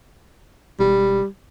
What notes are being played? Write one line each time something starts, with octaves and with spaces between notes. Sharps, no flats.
E1 G3